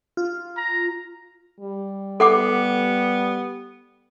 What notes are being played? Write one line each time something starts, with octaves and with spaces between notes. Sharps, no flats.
F4
A#5
G3
B3 A4 F#5 D6